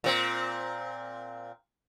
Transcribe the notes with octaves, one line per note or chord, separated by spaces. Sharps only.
A#2 C4